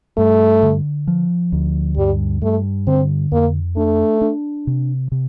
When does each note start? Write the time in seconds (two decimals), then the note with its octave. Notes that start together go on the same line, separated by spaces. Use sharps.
0.17 G2 A3
0.63 D3
1.07 F3
1.52 D2
1.97 G2 G3
2.42 G2 A3
2.87 D3 C4
3.32 F2 A#3
3.76 A3 D4
4.22 D4
4.67 C3
5.12 C3